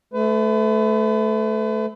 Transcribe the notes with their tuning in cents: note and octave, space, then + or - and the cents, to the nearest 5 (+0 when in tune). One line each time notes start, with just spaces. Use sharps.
A3 -15 B4 +35